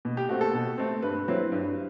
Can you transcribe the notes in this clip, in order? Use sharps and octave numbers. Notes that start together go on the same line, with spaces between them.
B2
G4
A3 C4 F#4
A4
B2
A3 C4
G2 B4
F#3 C4 E4
G2